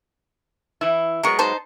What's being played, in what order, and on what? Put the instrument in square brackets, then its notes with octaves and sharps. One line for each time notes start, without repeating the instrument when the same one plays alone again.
[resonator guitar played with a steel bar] E3 E4
[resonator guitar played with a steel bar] F#3 G#3 B3 [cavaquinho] A#4 C#6
[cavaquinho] D#4 C5 A5